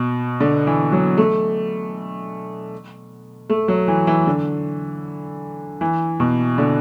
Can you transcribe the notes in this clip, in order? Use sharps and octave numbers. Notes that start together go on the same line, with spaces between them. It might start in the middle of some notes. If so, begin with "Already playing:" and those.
Already playing: B2
D3
E3
F#3
A3
A3
F#3
E3
E3
D3
E3
B2
D3